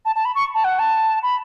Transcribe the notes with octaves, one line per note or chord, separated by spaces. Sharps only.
A5
A5
B5
C#6
A5
F#5
A5
B5